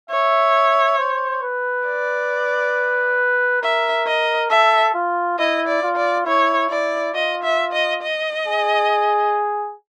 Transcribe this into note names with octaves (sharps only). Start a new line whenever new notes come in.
C#5 E5
C5
B4
D5
A#4 E5
D#5
A4 E5
F4
E4 D#5
D5
F4
D5
E4 C#5
E4 D5
F4 D#5
E5
D#5
D#5
G#4